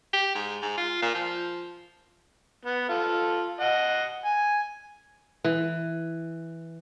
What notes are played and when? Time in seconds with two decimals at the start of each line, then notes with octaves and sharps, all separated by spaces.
0.13 G4
0.35 G#2
0.62 G#2
0.77 F4
1.02 A#2
1.15 F3
2.65 B3
2.89 F4 A4
3.60 D#5 F#5
4.26 G#5
5.44 E3